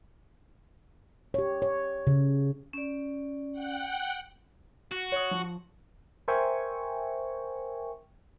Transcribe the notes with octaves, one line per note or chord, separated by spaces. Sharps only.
G4 C#5
C#5
C#3
C#4 D5
F#5 G5 F#6
F#4
C#5 D#6
F3
A#4 C5 E5 G5 G#5 C#6